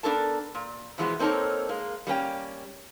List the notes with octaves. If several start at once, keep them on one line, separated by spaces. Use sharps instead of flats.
B3 D4 A4 A#4 A5
A#2
B2 E3 F3 G#3 A3 B3
A#3 C4 D#4 A4 A#4 C#5
G#3 A#3
G3 A#3 C#4 G5